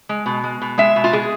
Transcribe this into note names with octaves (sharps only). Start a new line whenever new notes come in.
G#3
B2
G#3
B2
G#3 E5
B2
F4
G#3 G#4